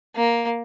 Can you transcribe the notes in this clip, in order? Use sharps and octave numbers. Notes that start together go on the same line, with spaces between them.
A#3